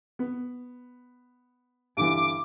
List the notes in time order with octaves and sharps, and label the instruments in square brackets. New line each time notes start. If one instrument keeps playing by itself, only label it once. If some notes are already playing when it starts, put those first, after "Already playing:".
[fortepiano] B3
[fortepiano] G2 D3 E3 [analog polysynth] D6